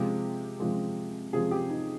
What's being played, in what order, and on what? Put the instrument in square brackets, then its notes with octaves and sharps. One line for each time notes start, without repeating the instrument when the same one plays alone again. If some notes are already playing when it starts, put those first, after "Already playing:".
Already playing: [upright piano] C3 F3 G#3 G4
C3 F3 G#3
C3 F3 G#3 G#4
G4
D#4